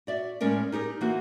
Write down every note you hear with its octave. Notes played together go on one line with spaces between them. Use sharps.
F#4 D5 E5
A2 G#3 C#4 A#4 D5
D#4 G4 G#4 A#4
E3 A#3 C4 F#4